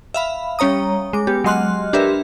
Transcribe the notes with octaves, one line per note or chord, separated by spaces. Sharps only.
E5 F5 B5
G3 C#4 C#5 A#5 D#6
G#3 D6
B3 G4
F#3 G#3 D#5 C6 F6 F#6
D4 G4 A#4 B4 E5